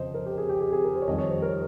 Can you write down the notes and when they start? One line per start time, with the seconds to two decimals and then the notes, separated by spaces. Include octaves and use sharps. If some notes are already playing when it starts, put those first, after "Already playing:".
Already playing: F2 C#3 F3 C5 D#5
0.14 A#4
0.26 G4
0.38 G#4
0.49 G4
0.60 G#4
0.73 G#4
0.84 A#4
0.95 C5
1.02 C#5
1.08 F2 D#3 G3 C4 D#5
1.18 C#5
1.30 C5
1.42 A#4